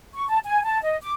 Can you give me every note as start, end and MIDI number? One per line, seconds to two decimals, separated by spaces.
0.14 0.27 85
0.28 0.38 81
0.44 0.64 80
0.64 0.79 81
0.83 0.97 75
1.02 1.14 86